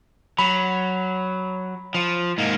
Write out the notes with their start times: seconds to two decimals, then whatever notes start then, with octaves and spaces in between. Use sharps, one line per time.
0.39 F#3 B5
1.94 F3
2.38 G#2 A#3